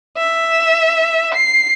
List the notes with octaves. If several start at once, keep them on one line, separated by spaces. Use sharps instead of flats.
E5
C7